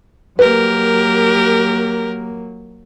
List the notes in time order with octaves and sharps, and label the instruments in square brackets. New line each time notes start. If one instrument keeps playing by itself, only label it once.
[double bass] F#3 A#3 [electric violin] G4 A#4 [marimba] B4